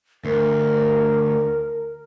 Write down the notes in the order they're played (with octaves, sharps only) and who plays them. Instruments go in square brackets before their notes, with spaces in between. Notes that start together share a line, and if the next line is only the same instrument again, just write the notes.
[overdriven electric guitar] D2 [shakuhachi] A#4